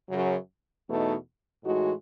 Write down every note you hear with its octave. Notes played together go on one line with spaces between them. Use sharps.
F#2 C#3 F#3
E2 B2 A3 D#4
A2 E3 G#3 D#4 F#4